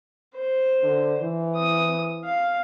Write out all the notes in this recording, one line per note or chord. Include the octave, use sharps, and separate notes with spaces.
C5
D3
E3
D#6
F5